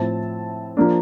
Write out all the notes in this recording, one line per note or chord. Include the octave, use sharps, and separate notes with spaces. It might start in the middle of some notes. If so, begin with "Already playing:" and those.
Already playing: A2 F3 C4 E4 A5
F3 A#3 D4